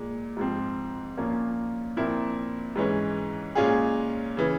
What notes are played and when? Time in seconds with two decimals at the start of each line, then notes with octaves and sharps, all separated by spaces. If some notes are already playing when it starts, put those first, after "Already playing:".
Already playing: A#2 G#3
0.37 G#2 F3 C4
1.17 A#2 F3 A#3 C#4 F4
1.97 A#2 F3 C4 E4 A#4
2.76 G#2 E3 G#3 C#4
3.55 A#2 G#3 C#4 F4 G#4
4.37 C#3 E3